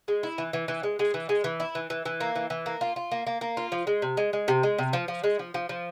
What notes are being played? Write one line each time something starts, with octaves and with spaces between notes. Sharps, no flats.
G#3
E4
E3
E3
E3
G#3
G#3
E3
G#3
E3
E4
E3
E3
E3
A#3
E3
E3
A#3
F4
F4
A#3
A#3
A#3
F4
F3
G#3
C3
G#3
G#3
C3
G#3
C3
F3
F3
G#3
F3
F3
F3